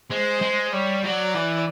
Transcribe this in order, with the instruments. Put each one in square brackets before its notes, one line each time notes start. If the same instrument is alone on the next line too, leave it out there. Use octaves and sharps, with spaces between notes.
[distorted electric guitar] G#3 [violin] C5
[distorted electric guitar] G#3
[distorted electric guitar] G3 [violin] C#5
[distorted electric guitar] F#3 [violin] D5
[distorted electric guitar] E3